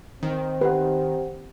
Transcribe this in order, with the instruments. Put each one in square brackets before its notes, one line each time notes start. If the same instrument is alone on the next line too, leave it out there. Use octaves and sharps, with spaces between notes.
[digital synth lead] D#3 [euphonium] C4
[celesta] G4 F#5 [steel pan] B4